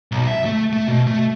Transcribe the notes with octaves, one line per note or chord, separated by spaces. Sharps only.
B1
E5
A3
A3
B2
A3